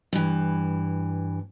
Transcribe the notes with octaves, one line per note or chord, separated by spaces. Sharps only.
G2 E3